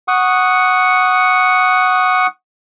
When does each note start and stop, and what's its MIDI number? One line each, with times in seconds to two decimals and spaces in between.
0.08 2.27 78
0.08 2.27 85
0.08 2.27 87